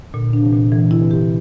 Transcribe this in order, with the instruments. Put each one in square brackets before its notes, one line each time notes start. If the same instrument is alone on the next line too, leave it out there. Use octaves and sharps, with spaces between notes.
[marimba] A#2 [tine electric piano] D3
[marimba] D4
[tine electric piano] C3 E3
[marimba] A#2
[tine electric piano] D3 [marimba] E3
[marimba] E4
[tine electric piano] C3 E3
[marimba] G4